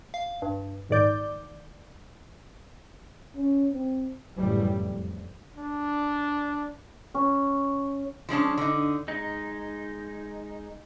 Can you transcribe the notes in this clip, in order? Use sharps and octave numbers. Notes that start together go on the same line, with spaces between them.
F5
G2
A#1 G#2 D#3 D5 G6
C#4
C4
A1 F#2 C#3 E3 F3 G3
F2
D4
C#4
F3 G#3 C#4 D4
D3 D#4
G#3 D#4